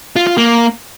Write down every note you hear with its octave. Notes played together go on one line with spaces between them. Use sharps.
F4
F4
A#3